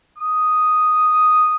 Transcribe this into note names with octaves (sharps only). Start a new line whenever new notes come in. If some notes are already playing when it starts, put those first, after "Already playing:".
D#6